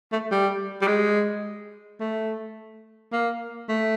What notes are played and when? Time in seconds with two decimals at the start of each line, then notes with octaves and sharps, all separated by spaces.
0.12 A3
0.31 G3
0.82 G3
0.87 G#3
2.00 A3
3.12 A#3
3.69 A3